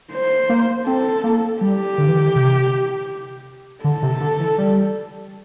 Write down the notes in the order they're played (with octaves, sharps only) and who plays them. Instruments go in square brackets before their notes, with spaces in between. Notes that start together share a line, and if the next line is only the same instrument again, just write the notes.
[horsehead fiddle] C5
[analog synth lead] A#3
[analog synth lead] C4 [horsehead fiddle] A4
[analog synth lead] A#3
[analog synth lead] G3 [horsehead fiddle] G4
[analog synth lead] D3
E3
D3
C3
[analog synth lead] D3 [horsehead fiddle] A4
[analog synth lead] C3
D3
E3
G3